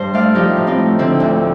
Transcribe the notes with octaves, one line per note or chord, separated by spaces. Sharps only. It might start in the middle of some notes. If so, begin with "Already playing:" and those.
Already playing: G2 C5
A3 D5 F5
F3 D#4 G4
A2
C4 D#4
A3
D3 C4
D2